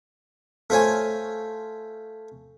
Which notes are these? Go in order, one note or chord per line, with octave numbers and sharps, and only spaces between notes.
A3 F4 C5 C#5 G#5